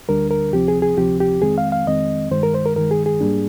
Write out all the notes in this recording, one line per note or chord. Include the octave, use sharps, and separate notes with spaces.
D2 D3 G3 D4 A#4
A#4
D2 C3 F3 C4 G4
G#4
G#4
D2 C3 F3 C4 G4
G4
F2 D#3 G#3 C4 G#4
F5
F5
F2 D#3 G#3 C4 D#5
G2 D#3 G#3 C5
A#4
C5
A#4
G2 D#3 G#3 A#4
G#4
G#4
G#2 G3 A#3 D4